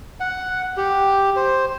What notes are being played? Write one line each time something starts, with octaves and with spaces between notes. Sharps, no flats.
F#5
G4
C5